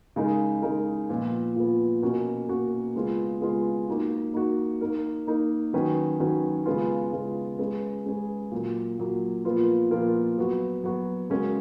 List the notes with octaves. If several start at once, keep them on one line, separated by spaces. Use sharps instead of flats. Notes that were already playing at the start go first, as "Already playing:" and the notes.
C#3 G#3 D#4 A#4
C#3 G#3 D#4 A#4
A#2 F3 B3
A#2 F3 B3
B2 A#3 C#4 F#4 A#4
B2 A#3 C#4 F#4 A#4
C#3 G#3 B3 F4 G#4
C#3 G#3 B3 F4 G#4
A#3 D#4 F#4
A#3 D#4 F#4
A#3 D#4 A#4
A#3 D#4 A#4
D#3 F#3 C#4 F#4 B4
D#3 F#3 C#4 F#4 B4
C#3 G#3 B3 F4
C#3 G#3 B3 F4
G#3 C#4 G#4 B4
G#3 C#4 G#4 B4
A#2 F#3 A#3
A#2 F#3 A#3
A#2 F3 B3 F4 A#4
A#2 F3 B3 F4 A#4
F#3 B3 F#4
F#3 B3 F#4
C#3 G#3 C#4 F#4 A#4